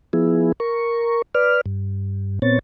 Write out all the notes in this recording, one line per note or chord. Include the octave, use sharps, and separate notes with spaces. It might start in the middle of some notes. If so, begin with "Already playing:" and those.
F3 B3 E4 G#4
A#4 C#6
B4 D5 F6
G2
A#2 B3 C4 C#5 A6